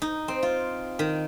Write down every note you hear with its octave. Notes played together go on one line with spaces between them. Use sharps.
D#4
C4
F4
D#3